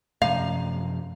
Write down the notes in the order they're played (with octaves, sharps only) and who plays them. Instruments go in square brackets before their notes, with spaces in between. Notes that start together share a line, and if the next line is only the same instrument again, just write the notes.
[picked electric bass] F#2 C3 F3 [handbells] A3 A#5 [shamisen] F5